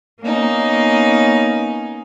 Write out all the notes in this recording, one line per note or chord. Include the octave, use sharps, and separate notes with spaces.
A#3 B3 C#4 D#4